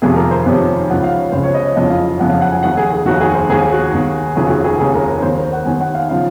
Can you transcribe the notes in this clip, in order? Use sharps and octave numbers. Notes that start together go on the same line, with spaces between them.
F1 F2 C3 D#3 G#4
A#4
C5
F1 F2 C3 D#3 C#5
C#2 C#3 F3 F#5
F5
C#5
C#2 C#3 F3 C5
C#5
D#5
C#5
F#1 F2 C#3 F3 D#5
F5
F#1 F2 C#3 F3 F#5
F5
F#5
G#5
F1 D#2 D#3 F#5
G#4
G#4
F1 D#2 D#3 F#4
G#4
C5
D#2 D#3 G#4
F#4
D#2 D#3
F1 D#2 C#3 F3 G#4
F#4
G#4
G#4
F1 D#2 C#3 F3 G#4
A#4
C5
C#5
D#2 D#3 C5
A#4
F#5
D#2 D#3 G#5
F#5
F5
C#3 F3 F5